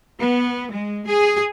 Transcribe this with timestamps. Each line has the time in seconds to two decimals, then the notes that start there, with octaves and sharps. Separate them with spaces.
0.19 B3
0.70 G#3
1.06 G#4